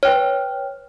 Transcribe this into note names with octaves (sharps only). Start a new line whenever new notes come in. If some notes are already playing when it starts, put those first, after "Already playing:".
B4 C#5 G5 F6